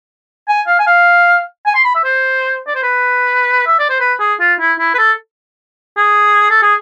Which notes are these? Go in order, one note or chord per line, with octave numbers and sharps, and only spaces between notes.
G#5
F5
G#5
F5
G#5
C6
B5
E5
C5
D5
C5
B4
E5
D5
C5
B4
G#4
F4
E4
E4
B4
A4
G#4
A4
G#4